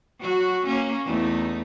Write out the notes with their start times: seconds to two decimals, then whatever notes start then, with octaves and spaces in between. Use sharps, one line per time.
0.20 F#3 F#4
0.66 A#3 C#4
1.06 E2 A3 D#4